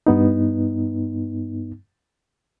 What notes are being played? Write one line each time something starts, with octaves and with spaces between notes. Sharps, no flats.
G2 B3 D#4